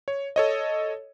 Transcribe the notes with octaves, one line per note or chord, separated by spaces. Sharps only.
C#5
A4 C#5 D#5